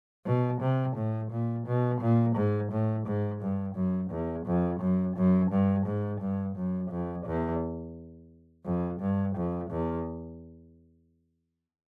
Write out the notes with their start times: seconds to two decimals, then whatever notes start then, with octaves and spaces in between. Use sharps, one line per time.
0.26 B2
0.61 C3
0.96 A2
1.31 A#2
1.67 B2
2.01 A#2
2.35 G#2
2.71 A2
3.07 G#2
3.41 G2
3.75 F#2
4.10 E2
4.46 F2
4.80 F#2
5.17 F#2
5.51 G2
5.86 G#2
6.21 G2
6.56 F#2
6.91 F2
7.26 E2
8.65 F2
9.00 G2
9.36 F2
9.71 E2